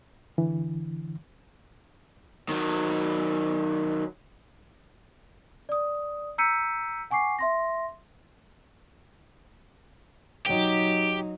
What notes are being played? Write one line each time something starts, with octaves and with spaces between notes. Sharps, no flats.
D3 E3
D#3 F#3
D5 D#6
A#5 E6 G6 B6 C#7 D#7
F#5 G#5 C#6 D6 C7
E5 C6 A#6
F#3 D#4 G4